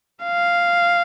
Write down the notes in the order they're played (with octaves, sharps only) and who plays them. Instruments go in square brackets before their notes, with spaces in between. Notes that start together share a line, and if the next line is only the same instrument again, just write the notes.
[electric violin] F5